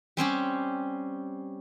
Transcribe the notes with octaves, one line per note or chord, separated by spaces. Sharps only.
G3 C4 C#4 G4